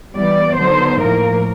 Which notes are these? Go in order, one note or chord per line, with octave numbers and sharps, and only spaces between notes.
E3 G3 B3 D5
D3 F#3 B3 D#4 C5
A2 F3 A#3 A#4